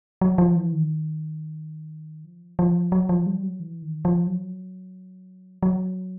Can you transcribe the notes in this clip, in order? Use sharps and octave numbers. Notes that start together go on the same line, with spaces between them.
F#3
F3
E3
D#3
F3
F3
F#3
F3
G3
F#3
E3
D#3
F3
F#3
F#3